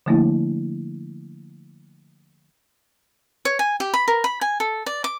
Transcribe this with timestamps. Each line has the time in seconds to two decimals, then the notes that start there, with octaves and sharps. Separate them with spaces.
0.06 D3 F3 A3 A#3 D4 E4
3.45 C#5
3.59 G#5
3.80 G4
3.94 B5
4.08 A#4
4.24 B5
4.41 G#5
4.60 A4
4.86 D5
5.04 D6